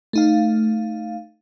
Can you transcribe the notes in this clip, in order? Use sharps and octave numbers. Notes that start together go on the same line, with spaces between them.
A3 D#4 F5